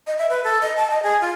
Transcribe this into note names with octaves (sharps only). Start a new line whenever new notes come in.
D#5
E5
B4
A4
D#5
A5
D#5
G#4
F4